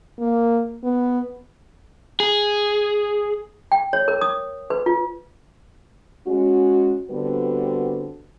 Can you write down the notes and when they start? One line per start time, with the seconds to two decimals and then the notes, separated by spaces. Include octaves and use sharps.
0.19 A#3
0.84 B3
2.20 G#4
3.72 G5
3.93 C#5
4.08 A#4
4.21 D#6
4.70 B4
4.86 F4
6.27 G#3 C#4 F#4
7.10 D3 G3 B3 C4 F#4 B4